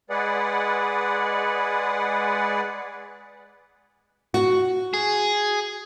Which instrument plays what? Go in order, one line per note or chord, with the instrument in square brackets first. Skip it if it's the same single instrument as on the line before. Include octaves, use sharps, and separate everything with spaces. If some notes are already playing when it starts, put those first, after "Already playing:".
[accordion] G#3 G#4 B4 D5 F#5
[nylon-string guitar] F#4
[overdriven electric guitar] G#4